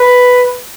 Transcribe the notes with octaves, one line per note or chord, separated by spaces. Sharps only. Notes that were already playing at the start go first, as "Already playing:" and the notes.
Already playing: B4